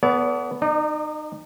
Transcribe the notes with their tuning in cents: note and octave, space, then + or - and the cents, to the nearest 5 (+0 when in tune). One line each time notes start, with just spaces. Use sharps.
B3 +0 A4 +0 D5 -45
D#4 -30 D5 +40